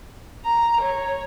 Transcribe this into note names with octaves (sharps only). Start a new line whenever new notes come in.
A#5
C#5